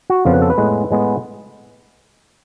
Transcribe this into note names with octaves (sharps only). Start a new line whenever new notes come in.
F#4
F2 C#3 F3 B3 F4
B4
A4
B4
A2 G#3 B3
A2 G#3 B3